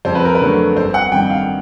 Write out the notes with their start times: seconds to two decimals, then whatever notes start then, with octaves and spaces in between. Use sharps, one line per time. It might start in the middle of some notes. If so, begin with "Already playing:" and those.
0.05 F2 C5
0.15 B4
0.25 A#4
0.35 B4
0.41 D3 F#3 A3
0.76 G1 C5
0.94 F#5
1.12 G2 D#3 G5
1.30 F5